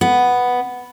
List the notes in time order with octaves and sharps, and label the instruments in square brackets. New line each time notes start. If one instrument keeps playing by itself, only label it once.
[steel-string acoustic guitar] B3